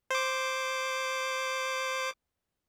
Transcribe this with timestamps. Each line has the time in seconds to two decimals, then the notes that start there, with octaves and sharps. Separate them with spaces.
0.11 C5 D6